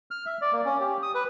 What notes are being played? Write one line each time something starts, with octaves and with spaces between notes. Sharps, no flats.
F6
E5
D5
A#3
C#4
G4
D#6
B4